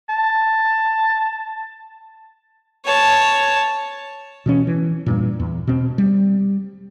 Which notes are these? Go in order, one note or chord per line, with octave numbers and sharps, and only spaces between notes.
A5
C#5 A5
B2 E3 C#4
E3
E2 G2 A#2
E2
B2 C4
G3